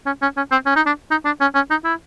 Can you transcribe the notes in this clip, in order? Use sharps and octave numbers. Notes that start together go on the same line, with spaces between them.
C#4
C#4
C#4
C4
C#4
D#4
D4
D#4
D4
C#4
C#4
D#4
E4